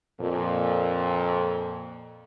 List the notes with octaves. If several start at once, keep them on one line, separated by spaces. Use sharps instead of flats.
F2 A#2